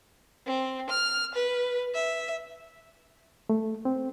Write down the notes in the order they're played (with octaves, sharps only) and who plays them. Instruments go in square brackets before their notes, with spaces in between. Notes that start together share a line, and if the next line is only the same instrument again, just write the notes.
[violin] C4
F6
B4
E5
[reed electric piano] A3
C4